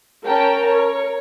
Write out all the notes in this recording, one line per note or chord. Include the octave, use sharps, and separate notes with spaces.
C#4 A#4 G5 A5
C#5